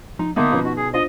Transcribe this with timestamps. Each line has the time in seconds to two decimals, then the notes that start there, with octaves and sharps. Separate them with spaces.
0.19 F3 D#4
0.36 D3 A#3 B3 D#4 E5 A5 C6 D#6
0.52 B2 F3 C#4 F4 B4
0.65 D#4 F#4
0.77 G#4
0.94 D4 F4 C5 D#5